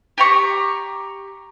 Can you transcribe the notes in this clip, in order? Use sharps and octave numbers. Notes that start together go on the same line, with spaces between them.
G4 A#5 C#6